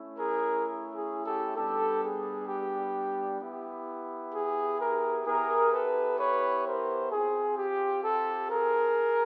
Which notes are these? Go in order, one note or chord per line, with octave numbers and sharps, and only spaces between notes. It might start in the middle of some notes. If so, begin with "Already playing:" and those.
Already playing: A3 C#4 E4
G#4 A#4
G#4
G4 A4
G3 B3 D4 G4 A4
G#4
G4
B3 E4 G4
G#4
G#4 A#4
B3 E4 G4 G#4 A#4
A4 B4
B4 C#5
A#4 C5
C4 F4 G#4
G4
G4 A4
G#4 A#4